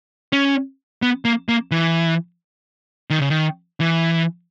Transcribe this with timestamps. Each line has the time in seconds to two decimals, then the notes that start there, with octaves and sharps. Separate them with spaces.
0.33 C#4
1.02 B3
1.25 A#3
1.49 A#3
1.71 E3
3.10 D#3
3.19 C#3
3.30 D#3
3.80 E3